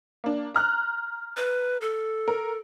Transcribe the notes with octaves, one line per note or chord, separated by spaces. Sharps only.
A#3 D4
A#5 F6 F#6
B4
A4
A#4